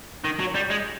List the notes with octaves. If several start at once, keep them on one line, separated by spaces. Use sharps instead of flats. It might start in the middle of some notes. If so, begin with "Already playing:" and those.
D#3
F#3
G3
G#3